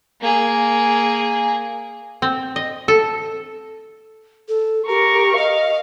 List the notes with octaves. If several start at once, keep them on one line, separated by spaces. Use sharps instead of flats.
A#3 G#4
C4
D#5
A4
A4
G4 A#4 C#6
D#5 F5